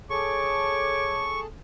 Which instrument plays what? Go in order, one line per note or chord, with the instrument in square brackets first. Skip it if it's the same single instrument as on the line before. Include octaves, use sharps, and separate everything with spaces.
[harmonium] G#4 A4 A5 [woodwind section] C#5 D6 [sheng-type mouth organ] C#6